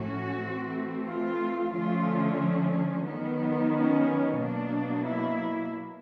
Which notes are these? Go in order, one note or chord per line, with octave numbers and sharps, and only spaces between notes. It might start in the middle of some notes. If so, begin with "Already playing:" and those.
Already playing: A2 F3 A3 C#4 F#4
E3 A3 C4
F4
D3 F3 A3 C#4 F4
D#3 F#3 B3
C#4
B2 F#3 A#3 D4
E4